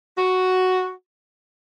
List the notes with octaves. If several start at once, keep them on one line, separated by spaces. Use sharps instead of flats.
F#4